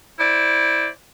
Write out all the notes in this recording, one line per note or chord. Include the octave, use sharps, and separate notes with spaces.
E4 C5 D5